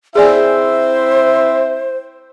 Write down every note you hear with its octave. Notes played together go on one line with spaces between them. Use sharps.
C4 E4 G#4 C5 D5 E5 G#5